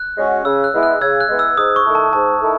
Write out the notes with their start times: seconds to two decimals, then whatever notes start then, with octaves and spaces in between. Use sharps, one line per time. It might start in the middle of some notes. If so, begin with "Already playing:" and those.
Already playing: F#6
0.17 G#3 C#4 F#4
0.45 C#3 E6
0.64 F#6
0.74 G#3 B3 E4
0.83 F#6
1.01 C#3 E6 G#6
1.21 F#6
1.29 G#3 B3 E4
1.39 E6
1.57 G#2 D#6
1.76 C#6
1.86 D#3 A3 E4 A4
1.95 A5
2.13 G#2 A5
2.41 D#3 A3 E4 A4